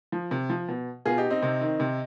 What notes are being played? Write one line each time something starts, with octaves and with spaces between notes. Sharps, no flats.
F3
C3
F3
B2
B2 F4 G#4
D#4 G4
C4 D#4
C3
D#3
C3